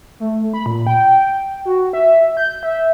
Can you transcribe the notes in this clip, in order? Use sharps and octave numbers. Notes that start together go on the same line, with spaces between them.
A3
B5
A#2
G5
F#4
E5
G6
E5